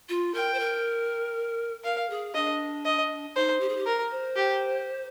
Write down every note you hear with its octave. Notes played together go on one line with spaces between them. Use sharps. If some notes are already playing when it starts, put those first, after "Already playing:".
F4
A#4 G5
C5
A#4
A#4 F5
G#4
D4 D#5
D#5
D#4 C5
G4
G#4
G4
A#4
C5
G4